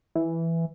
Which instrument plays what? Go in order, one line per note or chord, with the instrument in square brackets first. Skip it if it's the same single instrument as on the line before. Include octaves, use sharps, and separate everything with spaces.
[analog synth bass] E3